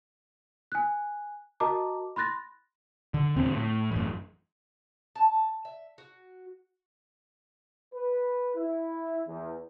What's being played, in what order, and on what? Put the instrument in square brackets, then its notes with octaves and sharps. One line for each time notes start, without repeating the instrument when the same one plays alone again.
[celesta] G#5 F#6
F#4 A#4 D#5 A5 A#5 D6
B5 C6 F#6 A6 A#6
[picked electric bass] D3
D#1 E2 D3 C4
A2
A1 F#2
[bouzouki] A5
E5
F#4
[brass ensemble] B4
E4
E2